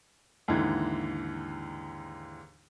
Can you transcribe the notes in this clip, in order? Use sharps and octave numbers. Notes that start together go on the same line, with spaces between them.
D#2 G#2 D3 E3